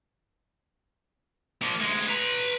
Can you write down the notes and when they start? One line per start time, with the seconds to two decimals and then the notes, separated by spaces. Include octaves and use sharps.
1.62 F3 A#3
1.80 D2 G#3
2.08 B4 A#5